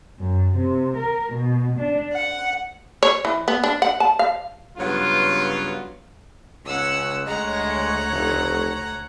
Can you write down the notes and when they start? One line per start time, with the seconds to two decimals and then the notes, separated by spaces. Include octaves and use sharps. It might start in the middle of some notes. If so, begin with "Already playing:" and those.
0.19 F#2
0.54 C3
0.94 A#4
1.33 B2
1.77 D4
2.12 F#5
3.03 C#5
3.25 E3
3.48 B3
3.64 D4
3.82 F#5
4.00 A5
4.19 F5
4.78 G2 C#3 F#3 B3 F4
6.65 C#2 C#4 F#5 E6
7.27 D2 G#3 C#5 F#5 A#5
8.11 F1